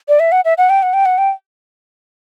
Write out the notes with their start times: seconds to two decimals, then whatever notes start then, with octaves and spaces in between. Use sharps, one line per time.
0.08 D5
0.20 E5
0.32 F#5
0.45 E5
0.58 F#5
0.70 G5
0.83 F#5
0.93 G5
1.05 F#5
1.18 G5